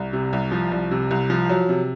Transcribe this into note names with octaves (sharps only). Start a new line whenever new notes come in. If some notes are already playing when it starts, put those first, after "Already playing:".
Already playing: C2
C3
C2
F3
C2
C3
C2
F3
F#3
C3